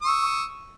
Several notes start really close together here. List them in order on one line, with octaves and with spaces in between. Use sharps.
D#6 C#6 E6